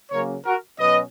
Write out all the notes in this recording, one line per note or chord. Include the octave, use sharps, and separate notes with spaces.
C#3 F#3 A#3 C#4 A#4 C#5
F#4 A#4
B2 F#3 C#4 B4 D#5